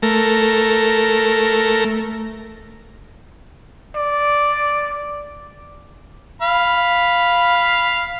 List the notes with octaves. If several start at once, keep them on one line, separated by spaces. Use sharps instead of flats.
A3 A#4
D5
F5 B5